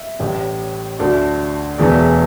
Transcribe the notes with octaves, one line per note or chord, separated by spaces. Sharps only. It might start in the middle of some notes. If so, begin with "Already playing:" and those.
Already playing: E5
A1 A2 G3
D2 D3 A3 D5
E1 E2 E3 A3 D5